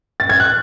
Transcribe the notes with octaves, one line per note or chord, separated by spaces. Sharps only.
A6
G#6
F#6